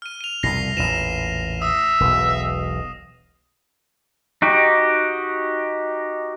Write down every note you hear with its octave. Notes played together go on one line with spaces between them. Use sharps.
F6 D#7
D#7 F7
C2 F2 B2 A#6 C7
A1 E2 A#2 D#7 E7
E5 D#6
E1 B1
D#4 F#4 G4